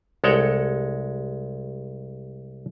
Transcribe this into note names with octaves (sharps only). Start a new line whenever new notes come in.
C2 G#3 A4 C#5 F#5 G5